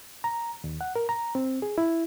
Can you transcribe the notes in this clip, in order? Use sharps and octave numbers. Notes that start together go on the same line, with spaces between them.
A#5
D#2
F#5
A#4
A#5
C4
G#4
E4